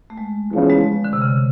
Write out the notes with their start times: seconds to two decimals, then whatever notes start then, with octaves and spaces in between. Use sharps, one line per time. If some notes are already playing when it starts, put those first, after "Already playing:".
0.10 A3
0.18 G#3
0.52 E2 C#3 F3
0.70 G#3
1.04 D3
1.13 C3
1.22 C#3